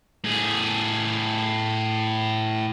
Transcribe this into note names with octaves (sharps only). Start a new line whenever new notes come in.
A2 G#4